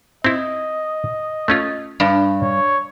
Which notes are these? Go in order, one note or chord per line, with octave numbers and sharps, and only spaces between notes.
C4 E4 D#5
A3 C#4 F4
G2
C#5